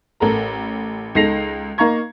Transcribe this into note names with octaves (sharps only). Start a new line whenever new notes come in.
A1 A4 A#4 A#5
C#2 D#4 A4 A#6 C7 F7
A#3 D#4 F5 A#5 C#6 G#6